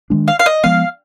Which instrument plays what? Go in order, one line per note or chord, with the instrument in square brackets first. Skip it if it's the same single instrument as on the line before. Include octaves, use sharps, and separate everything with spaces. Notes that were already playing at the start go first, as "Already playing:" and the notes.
[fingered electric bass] D#3 G#3 D4
[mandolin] F5
F5
D#5
[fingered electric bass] F3 G#3 B3 [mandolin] F5